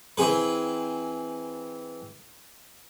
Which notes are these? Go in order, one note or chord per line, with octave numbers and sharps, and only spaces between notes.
E3 C4 G#4 B4